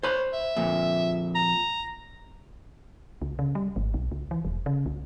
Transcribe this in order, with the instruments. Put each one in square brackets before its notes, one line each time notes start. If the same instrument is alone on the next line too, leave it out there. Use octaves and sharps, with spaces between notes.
[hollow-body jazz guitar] C5 B5 [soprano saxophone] C#5
[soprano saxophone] E5
[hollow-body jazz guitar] F2 A#2
[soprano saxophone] A#5
[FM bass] C#2
C#3
G3
G#1
B1
C#2
E3
E1
C#3
C#2